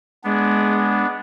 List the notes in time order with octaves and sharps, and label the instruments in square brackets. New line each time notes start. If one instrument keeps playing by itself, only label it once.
[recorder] G#3 [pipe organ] B3 D4